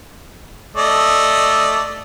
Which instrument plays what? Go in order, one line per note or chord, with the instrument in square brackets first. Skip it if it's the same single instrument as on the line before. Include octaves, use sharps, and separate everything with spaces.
[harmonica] A3 D5 D#5